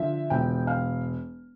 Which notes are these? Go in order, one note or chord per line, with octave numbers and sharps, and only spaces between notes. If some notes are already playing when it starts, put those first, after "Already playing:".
Already playing: D3 F3 E5
E1 G5
F5